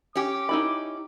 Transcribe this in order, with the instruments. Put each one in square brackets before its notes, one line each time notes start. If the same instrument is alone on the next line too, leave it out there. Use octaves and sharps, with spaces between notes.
[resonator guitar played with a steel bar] C#4 G4 [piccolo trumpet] D6
[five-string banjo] D#4 E4 B5